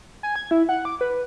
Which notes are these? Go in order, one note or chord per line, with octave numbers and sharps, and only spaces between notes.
G#5
G#6
E4
F#5
D6
B4